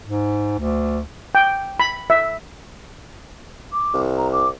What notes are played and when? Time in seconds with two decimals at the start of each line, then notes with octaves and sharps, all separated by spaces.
0.07 G#2
0.59 D2
1.35 G5
1.80 B5
2.10 E5
3.73 D6
3.93 C2
4.18 A#5
4.33 D6